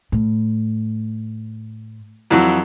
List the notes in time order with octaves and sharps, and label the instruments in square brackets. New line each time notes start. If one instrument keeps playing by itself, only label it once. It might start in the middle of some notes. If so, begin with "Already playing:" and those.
[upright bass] A2
[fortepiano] F2 E3 F#3